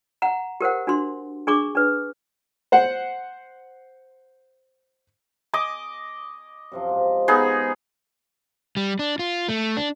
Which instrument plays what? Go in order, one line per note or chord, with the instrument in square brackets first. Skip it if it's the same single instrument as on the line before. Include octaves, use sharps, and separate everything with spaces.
[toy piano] F#5 A#5
G4 A#4 C5 F#5
D4 F#4 C6
D4 G#4 C#6 D6
D4 B4
[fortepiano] C5 F#5
[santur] D#5 D6 D#6
[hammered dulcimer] F#2 C3 F3
G#2
[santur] B3 D#4 G#4
[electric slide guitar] G3
D4
F4
A3
D4